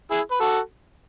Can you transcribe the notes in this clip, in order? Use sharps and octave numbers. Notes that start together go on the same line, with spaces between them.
E4 G#4
B4
F#4 A4